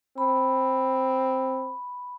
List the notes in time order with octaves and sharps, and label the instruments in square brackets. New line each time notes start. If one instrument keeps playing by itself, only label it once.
[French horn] C4 [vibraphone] B5